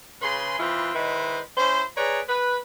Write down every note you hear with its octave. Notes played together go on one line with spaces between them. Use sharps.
C#3 G#4 B4 C6
E3 C4 E4 F4 B4
D#3 G#3 E4 B4 C5
C#4 E4 C5
G#4 B4 C#5 D5 A#5
B4